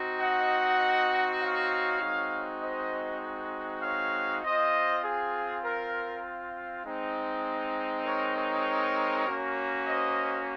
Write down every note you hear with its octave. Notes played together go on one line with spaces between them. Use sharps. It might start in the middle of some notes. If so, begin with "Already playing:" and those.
Already playing: C4 D#4 F#4
D#5 F#5
C#5 F5
G#3 C4 D#4 F#4
C5 D#5
C#5 F5
C4 F4 C5 D#5
G#4
A#4
G#3 C4 D#4
A#4 C#5
A#4 C#5
A#3 C#4 F#4
C5 D#5